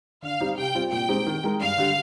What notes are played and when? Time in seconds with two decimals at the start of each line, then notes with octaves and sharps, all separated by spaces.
0.23 D3 F5
0.41 G3 C4 D#4
0.57 C3 G5
0.75 G3 C4 F4
0.92 A#2 G5
1.09 G#3 C4 D#4 G4
1.26 D#3
1.44 G#3 D#4 A#4
1.60 G2 F5
1.78 D3 G3